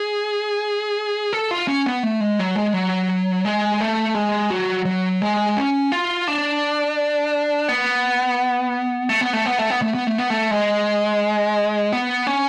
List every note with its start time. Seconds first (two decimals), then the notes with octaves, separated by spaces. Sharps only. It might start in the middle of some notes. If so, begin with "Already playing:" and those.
Already playing: G#4
1.33 A4
1.51 F4
1.68 C#4
1.86 B3
2.03 A3
2.20 G#3
2.39 F#3
2.56 G#3
2.73 F#3
3.45 G#3
3.81 A3
4.15 G#3
4.50 F#3
4.85 F#3
5.22 G#3
5.57 C#4
5.92 F4
6.28 D4
7.68 B3
9.09 A3
9.21 B3
9.33 A3
9.46 B3
9.59 A3
9.70 B3
9.82 A3
9.94 B3
10.07 A3
10.18 B3
10.30 A3
10.51 G#3
11.92 B3
12.27 C#4